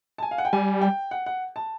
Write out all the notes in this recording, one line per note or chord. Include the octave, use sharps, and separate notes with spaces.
A5
G#5
F5
F#5
G5
G3 G#5
G5
F#5
F#5
A5